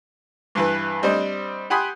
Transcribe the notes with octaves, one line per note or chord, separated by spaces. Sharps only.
G2 E3 B4
G3 C4 D4 C5 D#5
G4 F#5 G#5 B5 C6 D#6